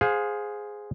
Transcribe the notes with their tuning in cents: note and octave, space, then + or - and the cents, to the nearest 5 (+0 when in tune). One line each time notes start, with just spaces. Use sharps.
G#4 +0 C5 -5 F5 +30